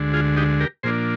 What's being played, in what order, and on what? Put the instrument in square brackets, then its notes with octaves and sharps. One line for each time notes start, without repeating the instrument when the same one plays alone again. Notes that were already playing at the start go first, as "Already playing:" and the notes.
Already playing: [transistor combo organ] D2 D3 G#3
F4 G#4
D#4 G4
G4 A#4
A#2 F3 A#3 D4 G#4 C5